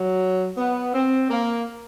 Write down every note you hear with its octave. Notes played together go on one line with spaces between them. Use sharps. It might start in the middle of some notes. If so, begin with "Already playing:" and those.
Already playing: F#3
B3
C4
A#3